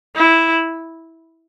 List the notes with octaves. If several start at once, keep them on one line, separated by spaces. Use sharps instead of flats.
E4